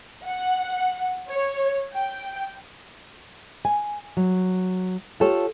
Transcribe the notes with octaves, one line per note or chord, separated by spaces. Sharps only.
F#5
C#5
G5
G#5
F#3
F4 G4 A4 C#5